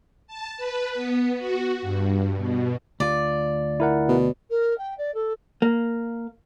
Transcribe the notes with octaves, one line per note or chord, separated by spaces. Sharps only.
A5
B4
B3
F#4
G2
B2
D2 F4 D5
E4 A#4 F#5
B2
A#4
G5
D5
A4
A#3